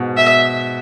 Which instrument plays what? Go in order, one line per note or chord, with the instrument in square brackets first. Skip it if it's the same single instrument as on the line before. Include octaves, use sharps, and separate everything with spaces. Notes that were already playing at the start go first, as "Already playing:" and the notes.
Already playing: [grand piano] G#2 B2
[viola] E5